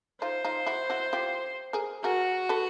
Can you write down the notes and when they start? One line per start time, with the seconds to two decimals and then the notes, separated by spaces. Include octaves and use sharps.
0.21 D#4 F4 C5
0.45 D#4 F4
0.66 E4 F#4
0.90 E4 F#4
1.13 F4 G4
1.73 G#4 A#4
2.04 F#4 G#4 A#4
2.49 A4 B4